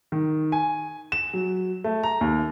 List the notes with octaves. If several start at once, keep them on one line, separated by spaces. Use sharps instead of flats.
D#3
G#5
E7
F#3
A3
A#5
D#2